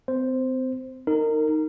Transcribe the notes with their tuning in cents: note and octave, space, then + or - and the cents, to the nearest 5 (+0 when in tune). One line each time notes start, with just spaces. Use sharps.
C4 -35 C5 +0
D#4 +0 A#4 -25